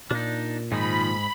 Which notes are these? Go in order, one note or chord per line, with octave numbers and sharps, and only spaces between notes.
A#2 D4 D#4
G#2 D#3 F3 D#4 B5